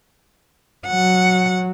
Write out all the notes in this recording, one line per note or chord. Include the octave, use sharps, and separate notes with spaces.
F#3 F#5